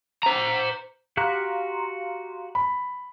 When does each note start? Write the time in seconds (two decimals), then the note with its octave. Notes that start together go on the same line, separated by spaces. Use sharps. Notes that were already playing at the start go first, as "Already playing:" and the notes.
0.23 C5 A#5
1.17 F#4 G4 F5 A#5 C6 F#6
2.55 B5